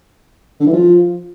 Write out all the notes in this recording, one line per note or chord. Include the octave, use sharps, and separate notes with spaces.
D3
E3
F3